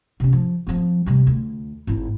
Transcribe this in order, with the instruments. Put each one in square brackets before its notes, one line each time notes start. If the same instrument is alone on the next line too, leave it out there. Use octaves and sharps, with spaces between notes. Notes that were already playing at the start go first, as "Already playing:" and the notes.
[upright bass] C3 C#4
F3
F3 C4
C3 G3
D2
G#1 E4